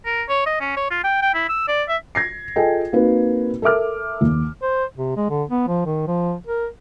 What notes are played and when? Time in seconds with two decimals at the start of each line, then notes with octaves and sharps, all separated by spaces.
0.06 A#4
0.29 C#5
0.46 D#5
0.61 C#4
0.77 C#5
0.91 F4
1.04 G5
1.22 G5
1.35 E4
1.49 E6
1.68 D5
1.89 E5
2.15 G#6 A#6 C7
2.56 F4 G#4 A4 D#5 G5 G#5
2.93 A#3 C4 D#4 F#4 B4
3.62 A4 A#4 E5 D6 F6
4.21 D#2
4.62 C5
4.97 C3
5.17 G#3
5.30 D3
5.50 B3
5.67 F3
5.86 D#3
6.07 F3
6.47 A#4